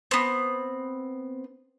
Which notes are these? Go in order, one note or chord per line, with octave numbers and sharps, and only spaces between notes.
B3 C4